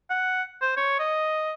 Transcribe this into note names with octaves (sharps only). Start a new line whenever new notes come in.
F#5
C5
C#5
D#5